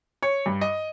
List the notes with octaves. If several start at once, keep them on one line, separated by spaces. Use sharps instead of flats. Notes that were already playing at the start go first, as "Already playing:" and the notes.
C#5
G2
D#5